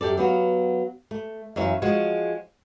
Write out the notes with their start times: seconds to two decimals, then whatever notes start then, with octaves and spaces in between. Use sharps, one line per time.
0.01 F#2 G4 A4 D5
0.17 F#3 B3 F#4 F5
1.11 A3
1.56 F#2 E3 C#5 E5 F5
1.82 F3 G#3 F#4 C#5